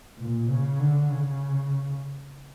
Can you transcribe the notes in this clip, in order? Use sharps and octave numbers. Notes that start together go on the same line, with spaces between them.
A#2
C#3
D3
C#3